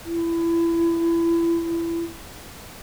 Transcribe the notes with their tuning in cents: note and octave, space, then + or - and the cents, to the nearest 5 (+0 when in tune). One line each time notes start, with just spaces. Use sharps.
E4 +25